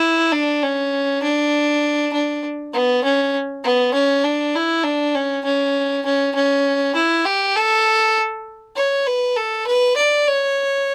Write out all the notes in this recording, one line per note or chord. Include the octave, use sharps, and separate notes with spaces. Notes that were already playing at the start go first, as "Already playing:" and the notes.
Already playing: E4
D4
C#4
D4
D4
B3
C#4
B3
C#4
D4
E4
D4
C#4
C#4
C#4
C#4
E4
G4
A4
C#5
B4
A4
B4
D5
C#5